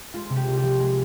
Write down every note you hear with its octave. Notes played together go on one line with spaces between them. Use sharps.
G#3 F4
C3
G4
C2
G4
F3
G#3 G#4